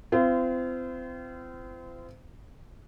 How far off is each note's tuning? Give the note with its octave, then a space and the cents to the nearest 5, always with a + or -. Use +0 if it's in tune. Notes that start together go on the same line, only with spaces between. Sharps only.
C4 -30 F4 -40